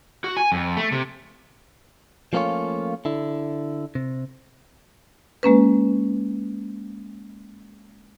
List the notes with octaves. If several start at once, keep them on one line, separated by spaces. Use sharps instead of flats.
F#4
G#5
F2
A3
C3
F3 A3 A#3 C#4 F4 C#5
D3 E4
C3
G#3 A#3 C#4 B4